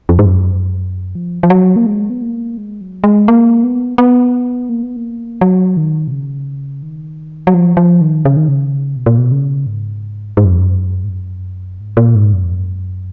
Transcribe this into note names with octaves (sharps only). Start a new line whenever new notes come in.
F2
G#2
F#2
F3
F3
F#3
A#3
G#3
B3
A#3
G#3
F#3
G#3
A#3
B3
B3
A#3
B3
A#3
F#3
D#3
B2
C#3
D#3
F#3
F3
F3
D#3
C#3
D#3
C#3
B2
A#2
B2
C#3
G#2
G#2
F#2
F2
F#2
G#2
F#2
G#2
A#2
G#2
F#2
F2
F#2